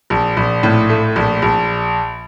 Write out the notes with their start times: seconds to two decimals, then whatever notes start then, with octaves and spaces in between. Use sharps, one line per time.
0.10 A#1
0.37 A#1
0.63 A2
0.89 A3
1.16 A#1
1.42 A#1